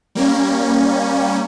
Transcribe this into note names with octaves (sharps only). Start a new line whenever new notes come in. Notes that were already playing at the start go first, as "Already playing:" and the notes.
G3 A#3 C#4